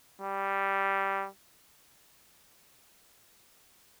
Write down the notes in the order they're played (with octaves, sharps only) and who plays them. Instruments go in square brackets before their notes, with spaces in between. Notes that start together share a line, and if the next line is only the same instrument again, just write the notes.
[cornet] G3